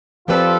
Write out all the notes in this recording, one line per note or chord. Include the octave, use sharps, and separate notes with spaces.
F3 C4 F4 G4 A4 B4 D5